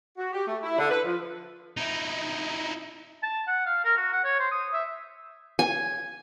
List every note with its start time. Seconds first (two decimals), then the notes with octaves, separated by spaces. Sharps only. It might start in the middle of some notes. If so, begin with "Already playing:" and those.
0.18 F#4
0.33 G4
0.47 A3
0.63 E4
0.78 D3
0.90 B4
1.05 F3
1.77 D#4 E4
3.23 A5
3.48 F#5
3.66 F5
3.84 A#4
3.97 F#4
4.13 F#5
4.24 C#5
4.39 C5
4.51 D#6
4.73 E5
5.59 G#5